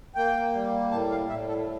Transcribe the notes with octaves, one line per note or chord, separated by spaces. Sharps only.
A#3 G5
G3
A2 A5
F5
A2 E5
A4